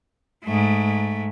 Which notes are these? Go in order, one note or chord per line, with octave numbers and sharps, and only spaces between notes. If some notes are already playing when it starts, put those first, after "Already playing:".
G#2 A3